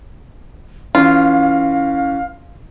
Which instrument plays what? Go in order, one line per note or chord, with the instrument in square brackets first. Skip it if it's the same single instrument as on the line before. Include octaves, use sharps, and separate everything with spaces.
[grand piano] E3 C#4 [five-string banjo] F4 [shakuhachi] F5